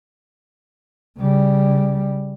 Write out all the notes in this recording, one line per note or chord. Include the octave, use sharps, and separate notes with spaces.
C#3 G3